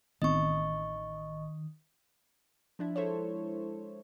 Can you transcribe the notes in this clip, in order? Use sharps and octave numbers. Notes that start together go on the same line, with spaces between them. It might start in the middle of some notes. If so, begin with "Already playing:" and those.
A1 D#3 B3 C4 D#5 C#6
F3 D4 E4
G#3 E4 A4 C5 C#5